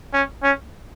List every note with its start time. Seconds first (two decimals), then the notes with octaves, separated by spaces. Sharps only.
0.13 C#4
0.43 C#4